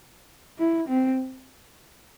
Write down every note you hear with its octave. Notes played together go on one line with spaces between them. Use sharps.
E4
C4